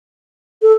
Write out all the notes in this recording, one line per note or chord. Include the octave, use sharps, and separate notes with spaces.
A4